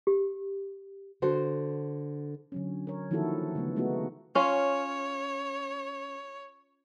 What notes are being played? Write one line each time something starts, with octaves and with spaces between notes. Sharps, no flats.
G4
D3 F#4 A4 C5
D3 F#3 C#4
A#4 C#5
D#3 F3 A#3 E4 F#4 A4
C#3 A3 B3
G#3 A3 B3 D#4 F4 F#4
C#4 F4 C#5